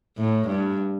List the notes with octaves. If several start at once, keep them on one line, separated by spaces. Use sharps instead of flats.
A2
G2